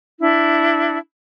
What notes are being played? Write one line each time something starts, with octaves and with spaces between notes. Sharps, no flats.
D4 E4